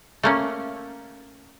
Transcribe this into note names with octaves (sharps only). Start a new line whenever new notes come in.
A3 A#3 C#4